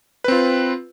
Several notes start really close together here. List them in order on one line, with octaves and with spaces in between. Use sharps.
B4 C4 F4